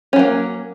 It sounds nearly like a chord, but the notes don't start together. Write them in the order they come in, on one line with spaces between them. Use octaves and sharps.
C#4 F#3 A#3